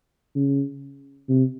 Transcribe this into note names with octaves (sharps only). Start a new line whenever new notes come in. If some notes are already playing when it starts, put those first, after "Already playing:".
C#3
C3